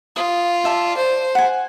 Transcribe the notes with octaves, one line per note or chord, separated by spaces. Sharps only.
F4 D#6
D5 E5 A5
C5
F#5 G#5